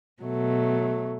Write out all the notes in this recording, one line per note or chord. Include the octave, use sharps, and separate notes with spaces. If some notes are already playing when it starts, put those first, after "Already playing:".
B2 F#3 A3